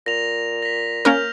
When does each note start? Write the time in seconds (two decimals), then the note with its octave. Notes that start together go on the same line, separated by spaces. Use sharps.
0.06 A#2 A#6 F7
0.62 A#6 B6
1.05 A#3 C#4 A#4 F6 G6 F7